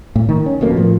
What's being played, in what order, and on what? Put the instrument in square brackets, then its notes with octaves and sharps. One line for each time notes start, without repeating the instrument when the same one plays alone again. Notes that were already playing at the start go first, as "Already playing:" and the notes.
[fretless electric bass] A2
D#3
C#4
D1 F2 B2 A#3
A2 F3